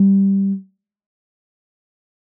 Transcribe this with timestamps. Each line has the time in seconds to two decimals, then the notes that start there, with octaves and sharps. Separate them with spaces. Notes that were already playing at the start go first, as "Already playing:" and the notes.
Already playing: G3